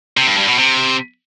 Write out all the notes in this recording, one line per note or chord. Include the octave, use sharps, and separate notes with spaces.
C3
G2
G2
B2
C3